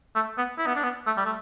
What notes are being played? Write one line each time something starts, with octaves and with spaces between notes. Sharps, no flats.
A3
B3
E4
B3
D4
B3
A3
G3
A3